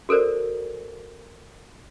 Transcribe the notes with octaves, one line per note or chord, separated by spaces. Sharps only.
F#4 A4 A#4 C5 D5